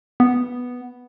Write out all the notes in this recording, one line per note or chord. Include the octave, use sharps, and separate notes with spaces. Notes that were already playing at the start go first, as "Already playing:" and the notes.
B3